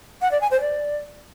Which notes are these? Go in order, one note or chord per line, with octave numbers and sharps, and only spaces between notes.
F#5
D5
G#5
C5
D5